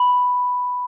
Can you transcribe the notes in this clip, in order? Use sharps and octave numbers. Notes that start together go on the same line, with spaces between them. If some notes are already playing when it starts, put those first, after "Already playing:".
Already playing: B5